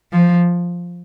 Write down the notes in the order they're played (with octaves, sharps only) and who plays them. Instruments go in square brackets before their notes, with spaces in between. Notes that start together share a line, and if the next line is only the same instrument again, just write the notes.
[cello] F3